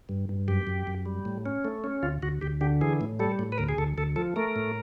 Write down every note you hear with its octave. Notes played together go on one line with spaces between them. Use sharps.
G2
G2
F#2 G4
F#2
F#2
G3
A2
C#4
A3
C#4
D2 F4
D2 F#4
D2 G4
D3 G4
E3 G#4
A2
G3 A4
A2
B4
D2 A#4
G#4
D2 A4
D2 A4
F3 A4
A3 A#4
A2